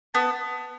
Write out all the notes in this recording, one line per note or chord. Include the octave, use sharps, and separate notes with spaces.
B3 A5